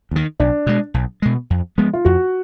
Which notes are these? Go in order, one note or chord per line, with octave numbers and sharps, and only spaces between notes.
D#2 D#3
B1 D4
B2 G#3
B1
B2 G#3
F2
F3 G#3 B3
F4
F2 F#4